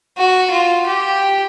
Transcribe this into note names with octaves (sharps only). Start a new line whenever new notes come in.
F#4
F4
G4